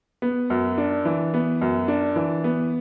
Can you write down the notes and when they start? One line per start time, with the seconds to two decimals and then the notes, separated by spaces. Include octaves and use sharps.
0.22 B3
0.50 F#2
0.78 D4
1.05 E3
1.34 B3
1.61 F#2
1.88 D4
2.16 E3
2.44 B3